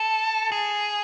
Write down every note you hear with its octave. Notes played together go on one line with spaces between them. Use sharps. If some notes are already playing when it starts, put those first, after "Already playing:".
Already playing: A4
G#4